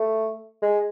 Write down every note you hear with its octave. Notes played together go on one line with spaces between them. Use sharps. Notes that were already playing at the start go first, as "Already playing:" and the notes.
Already playing: A3
G#3